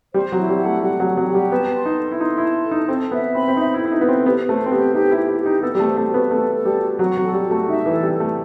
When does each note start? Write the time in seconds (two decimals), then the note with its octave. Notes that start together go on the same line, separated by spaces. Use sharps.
0.14 G3 C5
0.32 F#3
0.38 E4
0.49 G3
0.61 A3 F#5
0.83 G3 F#5
1.00 F#3
1.06 F#5
1.17 F#3
1.28 G4
1.35 G3
1.52 B3 A5
1.75 C6
1.86 D#4
1.97 A4
2.12 E4
2.20 D#4 C6
2.38 E4
2.42 A5
2.65 A4
2.71 D#4
2.88 C4 A4
3.11 B3 E5
3.34 C4 B5
3.48 C4
3.57 D#4 E5
3.74 E4
3.80 A4
3.85 E4
3.92 D#4
4.01 B3 A4
4.09 C4
4.25 B3 G4
4.49 A3 C5
4.66 C4
4.71 B3 G4
4.94 D#4 G4
5.11 E4
5.17 G4
5.28 E4
5.40 G4
5.46 D#4
5.63 B3 A4
5.75 G3
5.80 A3
5.86 C5
5.97 A3
6.08 F#4
6.14 B3
6.31 A3 A4
6.55 A4
6.65 G3
6.77 F#4
6.99 F#3 F#4
7.17 F#3
7.22 A4
7.34 G3
7.46 F#4
7.51 A3
7.68 D#4 E5
7.86 E3
7.91 A4
8.03 G3
8.14 A4
8.20 A3